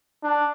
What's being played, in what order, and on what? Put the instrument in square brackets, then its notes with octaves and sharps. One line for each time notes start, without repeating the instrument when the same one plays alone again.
[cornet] D4